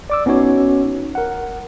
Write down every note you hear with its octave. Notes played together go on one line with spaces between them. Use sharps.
D5 D6 E6
B3 C#4 D#4 F#4 C#5
A#4 F#5